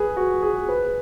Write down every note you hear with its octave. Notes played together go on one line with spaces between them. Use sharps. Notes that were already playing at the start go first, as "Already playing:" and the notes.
Already playing: G#4 B4
F#4
G#4
B4